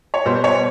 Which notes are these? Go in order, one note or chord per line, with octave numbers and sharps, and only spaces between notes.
C#5
B2 G3 B3 C5
C#5